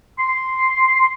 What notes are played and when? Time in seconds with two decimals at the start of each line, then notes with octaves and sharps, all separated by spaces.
0.19 C6